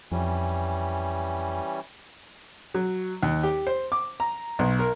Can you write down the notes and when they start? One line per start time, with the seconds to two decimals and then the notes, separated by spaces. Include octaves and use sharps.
0.12 F2 E3 G3 C#4
2.74 F#3
3.23 D#2
3.43 G4
3.67 C5
3.92 D6
4.20 A#5
4.59 B1
4.79 A#4